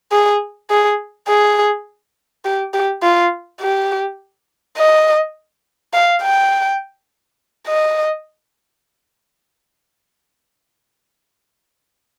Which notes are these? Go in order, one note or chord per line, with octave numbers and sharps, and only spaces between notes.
G#4
G#4
G#4
G4
G4
F4
G4
D#5
F5
G5
D#5